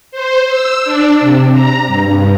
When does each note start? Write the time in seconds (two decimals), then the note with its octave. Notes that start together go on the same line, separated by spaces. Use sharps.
0.11 C5
0.48 E6
0.84 D4
1.20 C3
1.52 A#5
1.87 G2